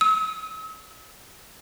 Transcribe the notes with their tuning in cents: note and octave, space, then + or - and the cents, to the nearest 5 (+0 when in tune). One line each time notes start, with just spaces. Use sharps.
E6 -45